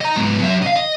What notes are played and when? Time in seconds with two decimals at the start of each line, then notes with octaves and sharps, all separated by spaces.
0.01 D#5 A#5
0.16 G#2 B3
0.40 F#2 E5
0.63 D#5 F5
0.77 D#5